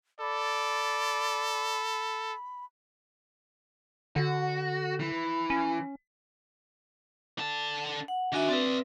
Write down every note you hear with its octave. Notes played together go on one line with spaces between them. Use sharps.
A4 D5 B5
D3 F#4
E3
C#4
D3 A5
F#5
D#3 D4 F#4 E5 G#5
C4 B4 D5 E5